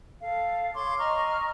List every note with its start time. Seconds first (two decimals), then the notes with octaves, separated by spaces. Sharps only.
0.21 A4 F5
0.74 C#5 C6 D6
0.98 D#5 A#5 C#6 F6